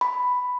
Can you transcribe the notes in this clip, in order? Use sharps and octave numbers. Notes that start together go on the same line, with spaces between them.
B5